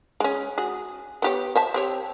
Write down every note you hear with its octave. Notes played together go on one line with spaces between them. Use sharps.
G#3 C#4
F#4 G#4
B3 G4 C#5
C5 E5 A5
C4 G4 C#5